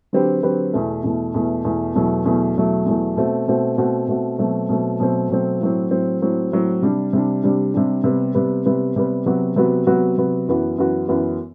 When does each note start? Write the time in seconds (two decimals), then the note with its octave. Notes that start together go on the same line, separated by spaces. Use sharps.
0.13 D3 F#3 C4 G4 B4
0.43 D3 F#3 C4 G4 B4
0.73 E2 B2 A3
1.04 E2 B2 A3
1.34 E2 B2 A3
1.65 E2 B2 A3
1.95 E2 B2 F#3 A3
2.25 E2 B2 F#3 A3
2.56 E2 B2 F#3 A3
2.86 E2 B2 F#3 A3
3.17 B2 A3 C4 F#4
3.48 B2 A3 C4 F#4
3.78 B2 A3 C4 F#4
4.08 B2 A3 C4 F#4
4.38 B2 F#3 A3 C4
4.69 B2 F#3 A3 C4
5.00 B2 F#3 A3 C4
5.30 B2 F#3 A3 C4
5.61 A2 F#3 C4
5.91 A2 F#3 C4
6.22 A2 F#3 C4
6.52 A2 F#3 C4
6.82 C3 G3 D4
7.13 C3 G3 D4
7.43 C3 G3 D4
7.74 C3 G3 D4
8.04 C3 G3 B3
8.35 C3 G3 B3
8.66 C3 G3 B3
8.96 C3 G3 B3
9.26 C3 F#3 B3 F#4
9.56 C3 F#3 B3 F#4
9.87 C3 F#3 B3 F#4
10.18 C3 F#3 B3 F#4
10.48 F#2 E3 B3 F#4
10.78 F#2 E3 B3 F#4
11.08 F#2 E3 B3 F#4